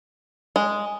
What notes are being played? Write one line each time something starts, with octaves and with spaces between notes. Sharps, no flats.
G#3